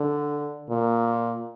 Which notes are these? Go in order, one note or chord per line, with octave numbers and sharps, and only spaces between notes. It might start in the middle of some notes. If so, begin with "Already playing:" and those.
Already playing: D3
A#2